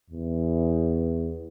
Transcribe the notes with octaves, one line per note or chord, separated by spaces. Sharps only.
E2